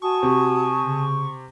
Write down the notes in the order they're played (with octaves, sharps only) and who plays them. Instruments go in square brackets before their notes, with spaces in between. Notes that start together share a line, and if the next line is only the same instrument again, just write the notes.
[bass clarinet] F#4 [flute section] G#5 A5 D#6 [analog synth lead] C#6
[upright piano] C3
[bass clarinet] C#3